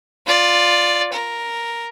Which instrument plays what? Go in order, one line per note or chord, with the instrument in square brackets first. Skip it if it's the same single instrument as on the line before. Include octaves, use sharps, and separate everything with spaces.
[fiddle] F4 D5
A#4